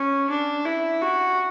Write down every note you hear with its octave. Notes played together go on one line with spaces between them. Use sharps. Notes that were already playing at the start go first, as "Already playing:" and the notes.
Already playing: C#4
D4
E4
F#4